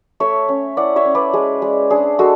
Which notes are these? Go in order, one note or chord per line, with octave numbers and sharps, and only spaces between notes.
A3 C#5 E5
C#4
E4 D5 F#5
C#5 E5
C#4
B4 D5
G#3 G#4
G#3
D4 G#4
G#3 F#4 A4